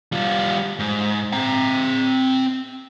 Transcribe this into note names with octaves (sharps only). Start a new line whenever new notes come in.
G3 F4
G#2
C4 A#5